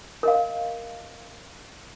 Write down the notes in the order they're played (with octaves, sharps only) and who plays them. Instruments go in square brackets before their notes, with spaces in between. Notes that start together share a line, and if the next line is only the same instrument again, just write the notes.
[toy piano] A#4 D#5 F5